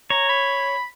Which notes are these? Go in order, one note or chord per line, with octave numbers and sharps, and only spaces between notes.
C#5 A#5
B5